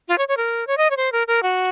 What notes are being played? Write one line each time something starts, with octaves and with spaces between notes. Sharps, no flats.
F4
C#5
C#5
A#4
C#5
D#5
C#5
C5
A#4
A#4
F#4